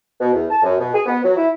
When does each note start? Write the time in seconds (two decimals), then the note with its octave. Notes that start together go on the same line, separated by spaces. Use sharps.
0.20 B2
0.33 E2
0.50 A5
0.63 F#2
0.79 B2
0.94 G#4
1.06 B3
1.23 F#3
1.37 E4